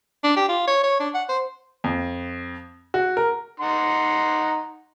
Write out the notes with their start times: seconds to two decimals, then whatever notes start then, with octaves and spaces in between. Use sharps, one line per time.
0.24 D4
0.36 G4
0.49 F4
0.68 C#5
0.83 C#5
1.00 D4
1.14 F#5
1.29 C5
1.84 F2
2.94 F#4
3.17 A#4
3.60 D#4 F#5 C6